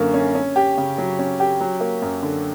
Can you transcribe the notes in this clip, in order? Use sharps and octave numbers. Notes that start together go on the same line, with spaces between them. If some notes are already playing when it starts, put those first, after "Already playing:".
Already playing: F#2 D3 A#3 C#4
C#4
C#4
G4
C#3
F#3
C#4
G4
F#3
A#3
F#2
D3